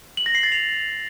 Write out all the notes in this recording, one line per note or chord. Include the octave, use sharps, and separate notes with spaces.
F#7
A#6
C7
A6
F7